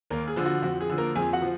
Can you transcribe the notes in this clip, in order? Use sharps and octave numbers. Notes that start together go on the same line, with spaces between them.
D#2 A#3 A#4
G#4
D3 F3
F#4
F2 F#4
G#4
D3 F3
A#3 A#4
F2 G#4 G#5
F#4 F#5
F3